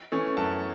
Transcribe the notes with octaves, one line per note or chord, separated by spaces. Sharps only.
E3 A3 C#4
F#2 A5